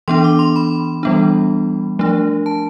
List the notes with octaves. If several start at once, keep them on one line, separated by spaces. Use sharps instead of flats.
E3 B3 D4 C6
D6
C6
B5
E3 G3 B3 D4
F3 A3 D4
A5